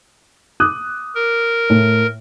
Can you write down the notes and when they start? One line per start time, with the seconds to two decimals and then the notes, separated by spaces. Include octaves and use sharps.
0.60 D6 D#6 F#6
1.15 A#4
1.70 A2